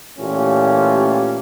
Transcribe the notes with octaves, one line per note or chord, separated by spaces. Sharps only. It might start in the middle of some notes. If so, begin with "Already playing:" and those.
A#2 E3 A3 C#4 F4 G4